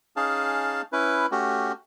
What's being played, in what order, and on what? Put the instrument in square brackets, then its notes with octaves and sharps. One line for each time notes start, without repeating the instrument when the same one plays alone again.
[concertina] C#4 D#4 G#4 F5 A5
C#4 E4 B4
A3 C#4 F#4 G4